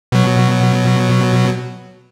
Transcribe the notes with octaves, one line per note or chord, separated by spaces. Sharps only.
B2 F#3